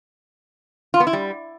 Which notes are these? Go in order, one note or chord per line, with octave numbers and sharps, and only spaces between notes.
F4
B3
E4
G3